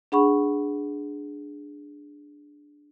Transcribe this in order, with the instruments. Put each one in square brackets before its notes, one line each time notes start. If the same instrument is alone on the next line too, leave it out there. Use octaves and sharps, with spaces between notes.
[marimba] D4 G#4 F#5 B5 C#6